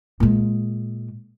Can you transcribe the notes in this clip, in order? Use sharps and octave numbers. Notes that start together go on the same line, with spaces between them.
A#2 G#3